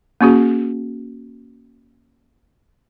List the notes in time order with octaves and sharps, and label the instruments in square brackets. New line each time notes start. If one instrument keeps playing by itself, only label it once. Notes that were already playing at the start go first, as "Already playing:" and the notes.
[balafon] A#3 C#4 F#4 G#4